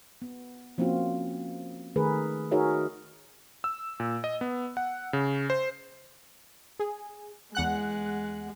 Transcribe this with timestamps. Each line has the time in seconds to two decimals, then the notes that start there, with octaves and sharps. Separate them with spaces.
0.22 B3
0.78 F3 A#3 C4 C#4 F4 F#4
1.96 D#3 A3 G#4 A#4 B4
2.51 D#4 F#4 G#4 A#4 C#5 E5
3.64 E6
4.00 A#2
4.24 D#5
4.41 B3
4.77 F#5
5.13 C#3
5.50 C5
6.79 G#4
7.55 E2 G#3 F#5 F#6